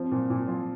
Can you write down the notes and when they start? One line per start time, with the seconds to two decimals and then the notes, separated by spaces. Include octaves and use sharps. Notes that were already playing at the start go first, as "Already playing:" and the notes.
Already playing: F3 C4
0.11 A#2
0.30 A#2
0.48 F3